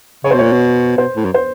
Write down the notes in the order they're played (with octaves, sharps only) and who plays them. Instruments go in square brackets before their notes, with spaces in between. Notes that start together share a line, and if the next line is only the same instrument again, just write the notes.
[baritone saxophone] C#3 [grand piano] C#5
[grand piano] C5
[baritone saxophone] B2
[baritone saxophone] A#2 [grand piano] C#5
[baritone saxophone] B2
[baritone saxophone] B2 [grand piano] C5
[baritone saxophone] A2
F#2
[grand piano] C5